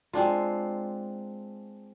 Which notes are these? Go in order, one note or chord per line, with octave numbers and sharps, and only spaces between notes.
G#3 C4 D4 F4